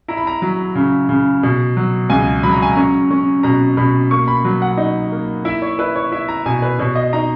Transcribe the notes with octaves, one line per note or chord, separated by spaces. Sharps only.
E4 A#5
B5
A#5
F#3
C#3
C#3
B2
F#3
C#2 G#5
F#3 B5
A#5
G#5
C#4 A#5
C#4
B2 A#5
B2 B5
A#3 C#6
B5
F#3
F#5
D#4
A#3
E4 E5
C#5
E4 B4
C#5
E4 E5
A#5
B2 G#5
B4
B2 C#5
D#5
D#4 A#5